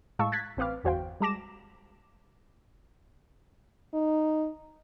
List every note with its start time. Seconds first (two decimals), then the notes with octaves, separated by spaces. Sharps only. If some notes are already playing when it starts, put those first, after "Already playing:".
0.19 A2 G#3 F5 A5 C#6 E6
0.32 F#6 G#6 A6 B6
0.57 A1 C4 B4 F5 D6 F6
0.83 G1 E2 F#4 C5 F5 G5
1.20 G3 G#3 A5 D6 A#6 E7
3.94 D#4